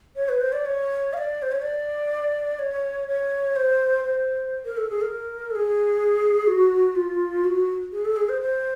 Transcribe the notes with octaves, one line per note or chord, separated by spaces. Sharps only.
C#5
B4
C5
D5
C#5
F5
D5
C5
C#5
D5
C#5
C#5
C5
C5
A#4
A4
G#4
A#4
A4
G#4
F#4
F4
F#4
G#4
A4
G#4
C5
C5